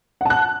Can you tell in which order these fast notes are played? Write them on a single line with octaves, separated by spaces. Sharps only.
F#5 A5 F#6